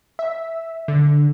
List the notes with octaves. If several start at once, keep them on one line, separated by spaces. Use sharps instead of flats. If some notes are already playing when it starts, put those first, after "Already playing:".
E5
D3